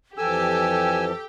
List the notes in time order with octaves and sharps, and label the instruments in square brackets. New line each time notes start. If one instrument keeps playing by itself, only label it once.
[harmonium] F2 E3 F3 [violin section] G4 G5 [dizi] A4 [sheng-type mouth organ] G#5 E6